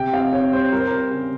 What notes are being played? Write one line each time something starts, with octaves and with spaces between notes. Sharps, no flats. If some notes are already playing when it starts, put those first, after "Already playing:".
Already playing: C3 G5
C4 F5
C4 C#5
G3 C5
G3 A#4
C5
C4 A#4
C#3